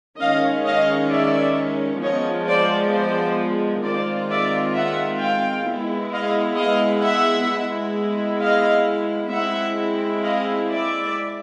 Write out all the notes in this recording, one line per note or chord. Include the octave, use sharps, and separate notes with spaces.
D#3 G#3 C#4 D#5 F5
D#5 F5
D5 E5
F3 G#3 B3 C#5 D#5
C5 D5
C5 D5
D#3 G#3 C4 F4 C5 D5
D5 E5
E5 F#5
F5 G5
G#3 B3 E4
D#5 F5
D#5 F5
E5 F#5
G#3 B3 E4
D#5 F5
G#3 C4 E4 E5 F#5
D#5 F5
D5 E5